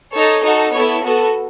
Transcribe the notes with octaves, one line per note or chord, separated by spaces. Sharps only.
D#4 A4 C#5
D#4 F#4 A4
B3 E4 A4 C#5
B3 F#4 A4